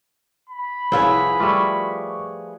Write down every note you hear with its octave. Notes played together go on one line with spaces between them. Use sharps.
B5
C2 F3 E4 G#4 B4 C#5
G3 A3 F4 C#6 D6